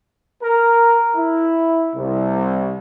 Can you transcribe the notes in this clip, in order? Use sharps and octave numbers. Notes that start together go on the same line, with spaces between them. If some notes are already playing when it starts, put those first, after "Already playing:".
A#4
E4
C2